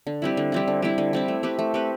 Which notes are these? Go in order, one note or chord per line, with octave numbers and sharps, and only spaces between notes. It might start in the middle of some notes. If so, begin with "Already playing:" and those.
D3
G3 C4 E4
D3
G3 C4 E4
D3
G3 C4 E4
D3
G3 C4 E4
A3
C4 G4 B4
A3
C4 G4 B4